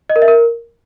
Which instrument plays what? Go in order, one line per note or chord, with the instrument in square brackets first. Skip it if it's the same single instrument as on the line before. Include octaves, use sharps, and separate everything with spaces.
[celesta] D#5
A#4
E5
A#4